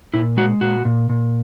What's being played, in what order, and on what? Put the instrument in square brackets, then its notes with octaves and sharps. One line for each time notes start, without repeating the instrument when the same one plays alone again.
[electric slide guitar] A#2 E4
G#3 F#4
A#2 F#4
A#2
A#2